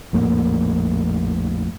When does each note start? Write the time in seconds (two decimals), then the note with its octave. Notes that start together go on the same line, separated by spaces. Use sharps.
0.13 A#1 F2 A2 A#3